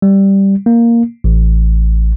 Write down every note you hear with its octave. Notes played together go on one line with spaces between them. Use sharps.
G3
A#3
A1